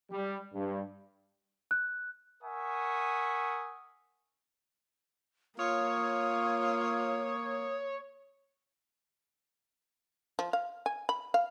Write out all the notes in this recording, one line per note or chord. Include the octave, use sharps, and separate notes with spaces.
G3
G2
F#6
A#4 E5 F#5 G#5 C#6 D#6
A#3 F4 C#5 D#6
F3
F5
G#5
B5
F5